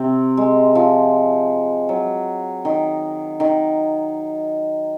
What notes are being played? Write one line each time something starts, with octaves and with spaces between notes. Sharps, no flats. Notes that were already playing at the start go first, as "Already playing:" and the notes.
Already playing: C3 C4
G#3
F3
F#3
D#3
D#3